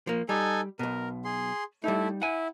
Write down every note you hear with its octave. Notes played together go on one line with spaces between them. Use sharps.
F3 A#3
G3 D#4 A4 G#5
B1 B2 A#4
G#4 C6
G3 A3 D#4 E4
E4 F#5 G#5